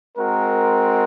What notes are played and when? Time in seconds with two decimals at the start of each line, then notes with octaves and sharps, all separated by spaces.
0.17 G#3 C4 F#4 A#4